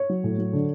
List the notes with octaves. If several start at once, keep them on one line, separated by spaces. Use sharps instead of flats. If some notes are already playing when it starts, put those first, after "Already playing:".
Already playing: C#5
F#3
A2
F#3
D3